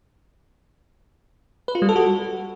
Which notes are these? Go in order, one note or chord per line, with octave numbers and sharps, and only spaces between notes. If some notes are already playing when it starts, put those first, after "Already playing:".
B4
F4
G3
A4
F#4